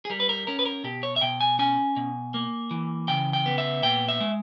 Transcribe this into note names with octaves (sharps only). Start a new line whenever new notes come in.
G#4
G3 A#4
B4
A#4
C#4 A#4
B4
A#4
B2 G4
C#5
E5
B2 G5
G#5
C#4 G#5
B2
A#3
E3
C#3 G5
G5
B3
E5
A#2 G5
E5
G#3